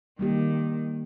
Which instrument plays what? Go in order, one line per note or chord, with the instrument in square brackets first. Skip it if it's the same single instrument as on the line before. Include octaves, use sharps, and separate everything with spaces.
[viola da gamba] D#3 [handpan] G3 A#3 G4